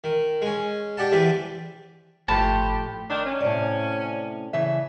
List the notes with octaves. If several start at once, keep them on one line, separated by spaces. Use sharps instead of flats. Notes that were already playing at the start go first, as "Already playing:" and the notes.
D#3
G#3 C#4
D4 G4 D5 F#5 A5
E2 C3 G3 B4 E5 B5
G1 A2 F3 A3 G4 A5 B5 C6
D#3 D4
C#4
A2 C3 D5
C#3 E3 E5